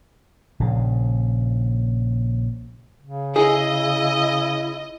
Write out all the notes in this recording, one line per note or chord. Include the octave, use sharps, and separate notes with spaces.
A#1 C#3
C#3
E4 G#4 D#5